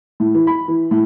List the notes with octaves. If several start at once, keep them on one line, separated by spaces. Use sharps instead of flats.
A2
E3
B5
E3
A2